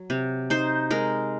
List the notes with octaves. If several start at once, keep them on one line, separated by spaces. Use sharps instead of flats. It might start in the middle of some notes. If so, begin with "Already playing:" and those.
Already playing: F#3
C3
D#4 C5
G#3 A#4